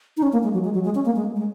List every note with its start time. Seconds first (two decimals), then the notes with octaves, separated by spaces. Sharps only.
0.17 D#4
0.23 C#4
0.33 A#3
0.43 G#3
0.54 F#3
0.64 G#3
0.74 F#3
0.84 G#3
0.95 C#4
1.05 A#3
1.16 G#3
1.36 G#3